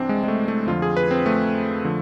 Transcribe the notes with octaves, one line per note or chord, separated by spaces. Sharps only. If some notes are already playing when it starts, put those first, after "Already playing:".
Already playing: C2 C3 E3 C4 D4
G#3
G#3
A3
A3
F2 D3 F3 F4
G#4
B4
C4
A3
D3 F3